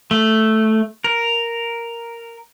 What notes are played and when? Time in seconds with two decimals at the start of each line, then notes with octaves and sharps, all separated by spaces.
0.11 A3
1.04 A#4